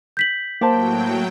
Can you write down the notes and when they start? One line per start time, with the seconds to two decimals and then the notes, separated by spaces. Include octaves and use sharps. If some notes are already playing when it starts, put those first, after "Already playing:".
0.17 G6 B6 F#7
0.61 A2 F#3 A#3 G4 C5 G5 A5